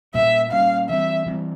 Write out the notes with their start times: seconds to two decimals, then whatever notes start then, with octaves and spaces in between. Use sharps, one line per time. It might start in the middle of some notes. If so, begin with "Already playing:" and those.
0.14 A#2 G3 A#3 C#4 E5
0.52 A#2 G3 A#3 C#4 F5
0.89 E3 G3 C4 E5
1.26 E3 G3 C4